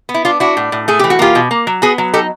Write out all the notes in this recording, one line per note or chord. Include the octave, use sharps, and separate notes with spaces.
B3
E4
D4 F4
D4 E4 F#4
A2
A2
A3 G#4
E3 G4
F#4
A#3 F4 G4
B2
A#3
F#3
B3 F#4 G#4
F#3
D#4 G4 A4